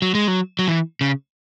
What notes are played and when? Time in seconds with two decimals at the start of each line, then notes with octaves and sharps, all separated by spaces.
0.02 F#3
0.15 G#3
0.28 F#3
0.59 F#3
0.68 E3
1.01 C#3